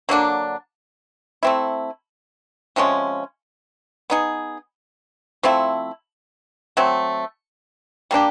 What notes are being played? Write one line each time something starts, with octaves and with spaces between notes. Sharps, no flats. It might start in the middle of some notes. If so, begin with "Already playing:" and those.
D3 F#3 A#3 D4
A3 C4 E4
C3 F3 G#3 C#4
B3 D#4 G#4
F3 A3 C4 E4
F#3 A3 C4
G3 A#3 D4 G4